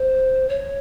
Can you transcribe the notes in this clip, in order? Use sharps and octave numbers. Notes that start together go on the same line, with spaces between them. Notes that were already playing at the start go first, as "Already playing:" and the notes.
Already playing: C5
C#5